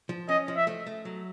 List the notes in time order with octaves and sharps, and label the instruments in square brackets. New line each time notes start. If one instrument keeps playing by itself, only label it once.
[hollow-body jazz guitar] F3
[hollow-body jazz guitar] C#4 [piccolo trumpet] D#5
[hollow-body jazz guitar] F3
[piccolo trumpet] E5
[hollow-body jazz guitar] A3
A3
F#3